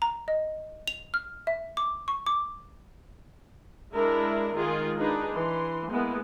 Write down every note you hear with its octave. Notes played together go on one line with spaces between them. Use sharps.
A#5
D#5
F7
F6
E5
D6
C#6
D6
G#3 D4 E4 A#4 E5
D#3 G#3 F4 G#4
D4 D#4 G#4 B4
E3 C6
G#3 A#3 B3 E4